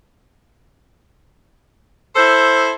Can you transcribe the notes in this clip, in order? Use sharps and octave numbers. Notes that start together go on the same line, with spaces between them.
E4 A4 C5